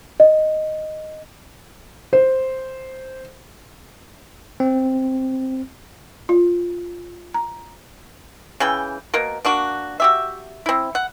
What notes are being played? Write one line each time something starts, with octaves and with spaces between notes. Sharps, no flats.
D#5
C5
C4
F4
A#5
C#3 E3 G5
B2 A#3 A#4
A#3 D4 F#4
F#4 G4 E5
C4 E4
F#5